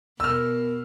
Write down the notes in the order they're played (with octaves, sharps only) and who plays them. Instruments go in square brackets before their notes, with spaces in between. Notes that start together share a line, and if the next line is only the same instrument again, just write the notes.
[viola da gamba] B2 [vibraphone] B3 A#4 [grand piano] E6 F6